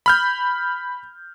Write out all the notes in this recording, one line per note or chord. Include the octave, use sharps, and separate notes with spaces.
B5 F6 G6